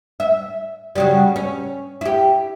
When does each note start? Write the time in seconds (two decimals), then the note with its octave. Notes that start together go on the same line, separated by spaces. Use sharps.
0.20 E5
0.95 C#3 F#3 G3
1.36 C#4
2.01 E4 G4